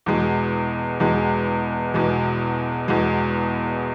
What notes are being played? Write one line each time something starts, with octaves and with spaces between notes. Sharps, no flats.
E2 B2 G#3
E2 B2 G#3
E2 B2 G#3
E2 B2 G#3